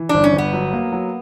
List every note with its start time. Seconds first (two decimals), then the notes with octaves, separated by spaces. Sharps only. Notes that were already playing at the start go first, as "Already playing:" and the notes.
Already playing: E3
0.09 G1 D4
0.24 C#4
0.33 G1
0.38 B3
0.53 F#3
0.73 A#3
0.92 F#3